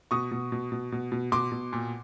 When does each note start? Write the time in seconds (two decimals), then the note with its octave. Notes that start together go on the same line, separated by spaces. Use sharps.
0.11 B2 C#6 D#6
0.31 B2
0.52 B2
0.72 B2
0.92 B2
1.12 B2
1.32 B2 C6 D6
1.52 B2
1.73 A#2